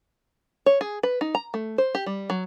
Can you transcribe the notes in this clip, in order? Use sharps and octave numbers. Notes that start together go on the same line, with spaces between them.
C#5
G#4
B4
D#4
A#5
A3
C5
G4
G3
F#3